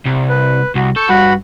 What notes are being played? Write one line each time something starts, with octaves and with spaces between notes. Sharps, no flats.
C2
B4
C2 F#4
A4 C#6 G6
G2 F#4 F#5 B5